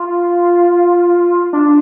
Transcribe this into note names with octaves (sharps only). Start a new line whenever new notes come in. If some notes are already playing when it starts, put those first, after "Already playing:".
Already playing: F4
D4